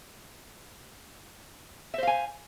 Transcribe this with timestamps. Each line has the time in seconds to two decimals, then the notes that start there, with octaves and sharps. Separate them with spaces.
1.94 E5
1.98 C5
2.03 F5
2.07 G#5